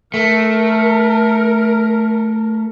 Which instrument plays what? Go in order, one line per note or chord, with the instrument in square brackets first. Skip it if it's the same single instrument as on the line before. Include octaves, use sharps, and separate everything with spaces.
[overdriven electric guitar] A3 [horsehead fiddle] A#4